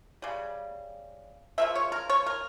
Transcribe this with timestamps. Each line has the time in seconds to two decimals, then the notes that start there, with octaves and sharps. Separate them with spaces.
0.22 C#3 G3
1.58 C#3 F3 A#3 E5
1.75 C#5
1.92 A#4
2.10 C#5
2.26 A#4